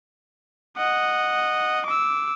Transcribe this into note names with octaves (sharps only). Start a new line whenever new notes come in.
D#5 F#5
D6 E6